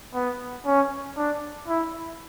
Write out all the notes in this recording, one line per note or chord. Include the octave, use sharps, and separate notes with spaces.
B3
C#4
D4
E4